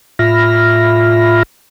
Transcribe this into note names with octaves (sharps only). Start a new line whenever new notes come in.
A2 F4 E5 B5 F6 A#6